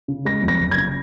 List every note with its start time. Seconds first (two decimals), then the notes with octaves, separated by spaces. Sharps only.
0.08 C#3
0.25 G#3 A#6
0.42 F2
0.48 A#6
0.60 F#1
0.71 G#6
0.77 C#3